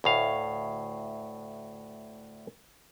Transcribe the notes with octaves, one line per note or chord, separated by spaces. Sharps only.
D2 A2 F5